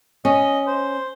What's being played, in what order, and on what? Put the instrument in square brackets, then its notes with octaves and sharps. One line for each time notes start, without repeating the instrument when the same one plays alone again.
[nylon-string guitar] C#4 [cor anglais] D#5
[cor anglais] C5